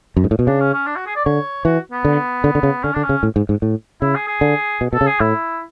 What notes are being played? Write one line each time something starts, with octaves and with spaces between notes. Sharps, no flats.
F#2
G#2
A2
B2
C#3 D4
C#4
C#4
D4
F#4
G#4
D5
D3 C#5
E3 F#4
B3
D3
D3
D3
C#3
D3 C#4
D3 D4
C#4
C#3
A2
G#2
G#2
A2
C#3 E4
G#4
G#4
D3
B2
B2 A4
C#3
G#4
A2 E4